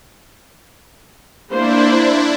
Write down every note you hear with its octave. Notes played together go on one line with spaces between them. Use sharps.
A#3 D4 E4 C5